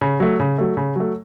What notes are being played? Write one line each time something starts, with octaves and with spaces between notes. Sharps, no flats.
C#3
F#3 A3
C#3
F#3 A3
C#3
F#3 A3